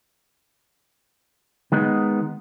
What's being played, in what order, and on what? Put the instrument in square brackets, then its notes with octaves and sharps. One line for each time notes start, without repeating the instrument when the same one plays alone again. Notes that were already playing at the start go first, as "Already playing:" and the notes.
[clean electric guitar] D#3 G#3 B3 D#4